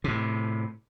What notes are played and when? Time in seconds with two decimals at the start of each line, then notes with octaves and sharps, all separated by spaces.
0.04 A2 C3